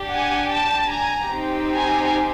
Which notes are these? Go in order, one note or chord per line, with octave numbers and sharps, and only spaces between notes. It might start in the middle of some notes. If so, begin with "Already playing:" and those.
Already playing: D4 G4
F#5 G#5
G5 A5
G#5 A#5
C4 D#4 G4
G#5 A#5